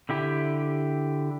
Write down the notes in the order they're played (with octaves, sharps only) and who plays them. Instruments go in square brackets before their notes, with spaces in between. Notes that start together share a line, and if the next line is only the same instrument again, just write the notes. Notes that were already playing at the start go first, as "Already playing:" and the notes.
[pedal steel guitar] D3 E4 G4